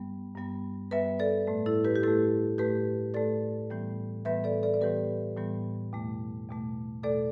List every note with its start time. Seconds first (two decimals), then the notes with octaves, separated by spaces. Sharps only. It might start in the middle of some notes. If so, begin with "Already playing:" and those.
Already playing: G2 G3 B3
0.36 G2 G3 B3
0.91 G2 G3 B3 B4 E5
1.19 A4 D5
1.47 A2 A3
1.66 E4 A4
1.85 G4 B4
1.96 G4
2.03 A2 A3 E4 A4
2.58 A2 A3 G4 B4
3.14 A2 A3 A4 D5
3.70 A2 E3 G3 B3
4.25 A2 E3 G3 B3 B4 E5
4.44 A4 D5
4.63 A4 D5
4.74 D5
4.81 A2 E3 G3 B3 G4 B4
5.37 A2 E3 G3 B3
5.93 E2 B2 A3
6.49 E2 B2 A3
7.03 E2 B2 A3 A4 D5